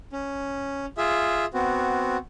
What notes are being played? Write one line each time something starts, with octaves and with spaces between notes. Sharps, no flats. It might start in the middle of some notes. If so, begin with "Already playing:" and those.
C#4
F4 G#4 E5
B3 C4 F#4